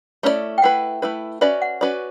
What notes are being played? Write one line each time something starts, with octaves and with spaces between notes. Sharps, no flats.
A3 C#4 E4 B4 D5
G5
A3 E4 B4 F#5
A3 E4 B4
C#4 F#4 B4 D5 E5
F#5
C#4 F#4 B4 D5